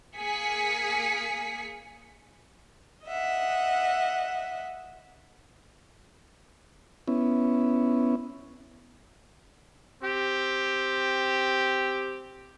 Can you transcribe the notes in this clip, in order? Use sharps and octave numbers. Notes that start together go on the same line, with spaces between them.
A#3 G#4 B6 C#7
D#5 E5 F#5
B3 C#4 E4
C4 G4